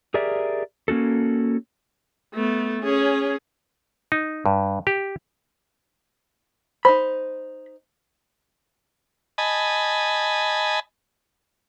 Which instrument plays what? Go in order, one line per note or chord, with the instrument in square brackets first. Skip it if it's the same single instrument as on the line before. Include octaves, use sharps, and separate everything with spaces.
[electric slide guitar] G4 G#4 A#4 D5 E5
A#3 C#4 F#4 A4
[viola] A3 B3
C#4 G#4
[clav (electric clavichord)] D#4
G2
G4
[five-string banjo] D#4 C5 [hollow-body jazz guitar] B5
[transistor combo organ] D#5 G#5 A5 B5